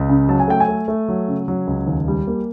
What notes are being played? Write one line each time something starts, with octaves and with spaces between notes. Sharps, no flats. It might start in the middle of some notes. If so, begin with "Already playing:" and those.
Already playing: C#2
C#3
F#3 A5
G#5
A3 G5
G#5
A3
A3
F#3
C#3
F#3
C#2
D#2
G3
A#3